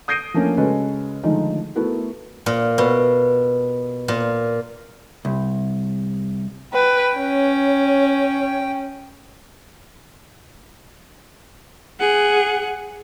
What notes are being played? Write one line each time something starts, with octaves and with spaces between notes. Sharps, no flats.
D#6 G6 A#6 C7 D7 D#7
F3 A3 A#3 C#4 D4
C#3 G#3 C#4 F#4 A4 B4
D3 D#3 F3 G#3 A3 D#4
A3 B3 E4 F#4 A4 A#4
A#2
B2
A#2
C2
B4 G5
C#4 C#5
G#4 F#5